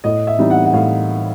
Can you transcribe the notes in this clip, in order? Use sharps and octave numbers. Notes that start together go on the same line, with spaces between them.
A2 D#5
E5
E3 G3 C4 D#4
F#5
F#5
A2 F5